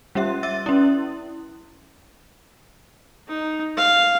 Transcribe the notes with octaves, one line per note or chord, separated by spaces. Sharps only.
G3 C#4 G4 E5
E5 E6 A6
C#4 E4
D#4
F5